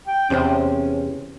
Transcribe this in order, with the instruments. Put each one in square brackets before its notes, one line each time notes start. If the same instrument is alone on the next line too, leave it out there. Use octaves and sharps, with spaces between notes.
[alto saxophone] G5
[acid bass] E2 [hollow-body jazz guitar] C3 C5 G5 [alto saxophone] C#4